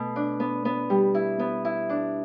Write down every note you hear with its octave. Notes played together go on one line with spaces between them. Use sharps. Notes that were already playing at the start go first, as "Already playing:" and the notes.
Already playing: B2 A3
D4
B3
B3
G3
E4
B3
E4
D4